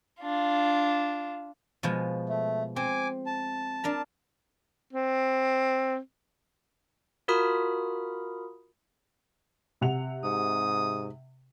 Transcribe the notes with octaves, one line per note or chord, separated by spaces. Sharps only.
D4 F4
B2 F3 G#3
A3
C4 G#5 D6
A5
D4 A#4 A#5
C4
F4 F#4 A#4 B5 D#6 F6
C3 F#5 F7
G#2 D#6